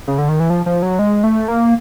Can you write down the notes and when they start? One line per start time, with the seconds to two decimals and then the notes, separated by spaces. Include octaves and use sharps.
0.08 C#3
0.18 D3
0.29 D#3
0.40 E3
0.50 F3
0.66 F3
0.83 F#3
0.99 G#3
1.24 A3
1.48 A#3